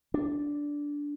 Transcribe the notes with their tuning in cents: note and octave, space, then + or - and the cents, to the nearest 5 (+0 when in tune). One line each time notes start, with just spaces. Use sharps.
D4 -10